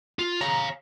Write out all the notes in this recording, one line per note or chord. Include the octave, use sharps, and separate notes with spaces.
F4
C#5 F5 A#5